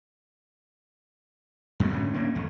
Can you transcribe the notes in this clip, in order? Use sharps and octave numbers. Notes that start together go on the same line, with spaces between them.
F2 B2 F#3 A3
G#2 D3 A3 C#4
D3 A#3 C#4 D4
G#1 F2 A3